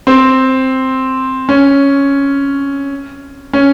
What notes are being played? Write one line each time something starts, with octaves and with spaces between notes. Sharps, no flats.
C4
C#4
C#4